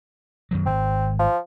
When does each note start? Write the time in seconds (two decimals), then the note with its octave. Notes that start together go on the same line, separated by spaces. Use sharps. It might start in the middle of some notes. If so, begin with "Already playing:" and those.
0.51 F#2 D#3 F#3
0.66 G#1 C4
1.19 F3